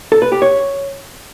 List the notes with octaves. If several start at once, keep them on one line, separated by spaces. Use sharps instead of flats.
A4
B4
G4
C#5